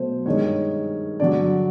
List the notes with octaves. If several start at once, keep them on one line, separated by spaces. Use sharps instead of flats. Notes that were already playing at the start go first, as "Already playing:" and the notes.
Already playing: B2 F#3 A3 C5
G2 D#3 G#3 C#5
G2 D3 F#3 D5